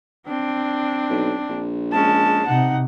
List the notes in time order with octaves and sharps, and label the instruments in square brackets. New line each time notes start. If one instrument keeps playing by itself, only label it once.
[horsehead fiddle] C4 D4
[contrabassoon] B1
A#1
[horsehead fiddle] G#3 C#4 [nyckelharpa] A5
[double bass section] C3 [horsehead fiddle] D#4 F#5